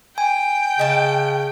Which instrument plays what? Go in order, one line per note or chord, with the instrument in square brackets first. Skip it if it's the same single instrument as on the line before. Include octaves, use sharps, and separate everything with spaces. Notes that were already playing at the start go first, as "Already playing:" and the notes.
[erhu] G5 [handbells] G#5
[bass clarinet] C#3 [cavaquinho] D#5 A5